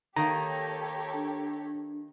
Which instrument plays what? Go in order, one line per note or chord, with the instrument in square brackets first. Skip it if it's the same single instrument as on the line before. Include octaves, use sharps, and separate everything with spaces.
[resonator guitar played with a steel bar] D#3 A#3 [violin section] G4 A4 C#5 [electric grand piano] A#5
[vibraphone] D4